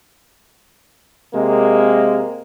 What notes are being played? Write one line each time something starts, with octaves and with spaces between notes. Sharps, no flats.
C3 G#3 A#3